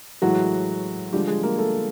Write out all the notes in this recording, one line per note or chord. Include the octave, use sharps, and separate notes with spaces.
A2 E3 F#3 G#3 F#4
D3 F3 G3 G#3 G4
G#3 G#4
A#3 A#4
A3 A4